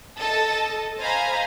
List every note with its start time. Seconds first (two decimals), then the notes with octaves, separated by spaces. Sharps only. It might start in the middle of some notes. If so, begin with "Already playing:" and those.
0.18 A4 D#5 A5
1.00 C5 D#5 F5 G#5 A#5 B5